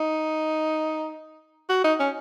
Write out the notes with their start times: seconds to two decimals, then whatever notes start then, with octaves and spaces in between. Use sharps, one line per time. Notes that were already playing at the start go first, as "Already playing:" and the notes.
Already playing: D#4
1.70 F#4
1.84 D#4
2.00 C#4